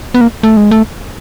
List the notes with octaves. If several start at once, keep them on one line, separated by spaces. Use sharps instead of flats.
B3
A#3
A3
G#3
A3